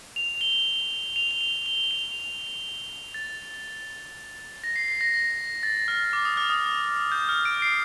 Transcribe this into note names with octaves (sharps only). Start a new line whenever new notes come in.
F7
G7
F7
G7
F7
G7
F7
A6
A#6
C7
C7
A#6
A#6
A6
F6
D6
D#6
F6
D#6
G6
F6
D7
C7